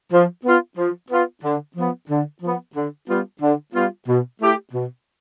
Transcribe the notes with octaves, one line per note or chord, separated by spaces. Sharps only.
F3
B3 F4
F3
B3 F4
D3
F3 B3
D3
F3 B3
D3
G3 B3 F4
D3
G3 B3 F4
B2
A3 E4 G4
B2